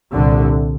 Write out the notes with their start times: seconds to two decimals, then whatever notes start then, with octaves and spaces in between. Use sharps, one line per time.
0.13 C2 A#2 D3